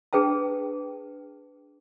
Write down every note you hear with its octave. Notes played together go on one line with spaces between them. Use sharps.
D4 G#4 B4 G5 A5